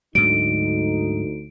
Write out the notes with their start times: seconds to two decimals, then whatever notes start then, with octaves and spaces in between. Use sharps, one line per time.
0.15 D2 G#2 F#3 D#4 D7